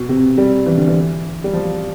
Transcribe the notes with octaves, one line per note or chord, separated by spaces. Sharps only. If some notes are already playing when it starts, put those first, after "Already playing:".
Already playing: B2
C3
G3
E3
D3
E3
G3
F3